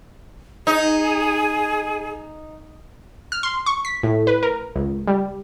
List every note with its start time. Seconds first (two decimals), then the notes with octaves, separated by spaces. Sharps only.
0.67 D#4 G#4
3.32 F6
3.43 C6
3.66 C#6
3.85 B6
4.03 A2
4.27 B4
4.43 A#4
4.76 C#2
5.07 G3